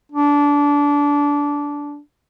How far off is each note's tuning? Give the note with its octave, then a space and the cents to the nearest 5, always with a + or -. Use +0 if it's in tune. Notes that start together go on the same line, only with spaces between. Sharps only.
D4 -20